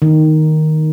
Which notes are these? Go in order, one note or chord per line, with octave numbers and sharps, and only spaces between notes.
D#3